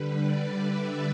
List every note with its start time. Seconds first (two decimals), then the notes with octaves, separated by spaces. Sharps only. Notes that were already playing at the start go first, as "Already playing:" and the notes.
Already playing: D3 G3 B4
0.13 D5
0.56 E5